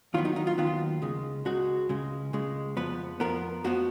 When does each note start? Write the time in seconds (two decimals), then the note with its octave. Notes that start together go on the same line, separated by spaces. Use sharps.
0.14 D#2 D#3 F#3 B3 F4
0.25 D#4
0.36 D#4
0.47 F4
0.58 D#2 D#3 F#3 B3 F4
1.02 C#2 C#3 G#3
1.45 C#2 C#3 G#3 F#4
1.89 C#2 C#3 G#3
2.33 C#2 C#3 G#3
2.77 F2 F3 B3 B4
3.20 F2 F3 B3 A#4
3.64 F2 F3 B3 F#4